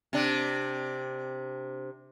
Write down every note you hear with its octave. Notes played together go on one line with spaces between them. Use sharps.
C3 D4